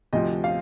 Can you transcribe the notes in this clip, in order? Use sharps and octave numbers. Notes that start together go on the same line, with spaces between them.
D2 C3 F3 D#5
F5